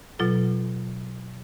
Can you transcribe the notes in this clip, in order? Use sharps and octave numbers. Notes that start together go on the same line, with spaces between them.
B2 F#3 F4 A4